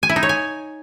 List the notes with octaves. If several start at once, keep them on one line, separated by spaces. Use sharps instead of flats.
G#5
E4
D#4
C#5
G#5